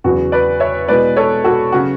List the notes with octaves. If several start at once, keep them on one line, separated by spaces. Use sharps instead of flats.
E2 C#3 F#3 F#4
B4 D5
C#5 E5
B2 G#3 B3 E4 B4 D5
A4 C#5
F#4 A4
C#3 F#3 F#4